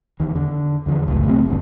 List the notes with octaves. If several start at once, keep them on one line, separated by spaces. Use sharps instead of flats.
E2 D#3
D3
E2 D3 F3
G1 C#2 F#2 A2
C3 F#3 A3 C4
E1 A#1 G2 D3